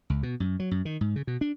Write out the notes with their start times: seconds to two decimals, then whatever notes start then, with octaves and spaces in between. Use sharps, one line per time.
0.10 C#2
0.23 B2
0.40 F#2
0.60 F#3
0.71 F#2
0.85 D#3
1.01 G#2
1.16 C#3
1.27 B2
1.41 D4